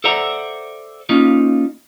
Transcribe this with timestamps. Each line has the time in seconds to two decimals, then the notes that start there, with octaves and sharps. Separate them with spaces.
0.04 A4 C5 D5 E5 F#5 A#5
1.09 A#3 C#4 D#4 F4